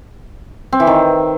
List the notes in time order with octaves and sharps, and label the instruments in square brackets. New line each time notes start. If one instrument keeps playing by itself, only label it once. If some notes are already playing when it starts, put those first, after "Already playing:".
[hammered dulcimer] C4
E3
D#3